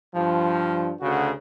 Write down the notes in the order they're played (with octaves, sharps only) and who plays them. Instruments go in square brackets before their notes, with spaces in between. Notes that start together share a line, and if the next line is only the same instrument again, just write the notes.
[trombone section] G2 F3
D2 C#3 F#4